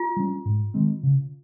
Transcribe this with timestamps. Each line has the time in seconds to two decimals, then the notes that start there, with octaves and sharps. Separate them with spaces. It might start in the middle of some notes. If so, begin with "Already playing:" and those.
Already playing: F4
0.16 G3 C#4
0.45 G#2
0.74 D#3 G#3 C4
1.03 C#3